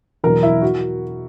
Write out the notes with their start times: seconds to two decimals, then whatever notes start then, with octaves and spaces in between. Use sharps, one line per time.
0.24 E2 B2 F#3 A#4
0.43 E4
0.62 F#4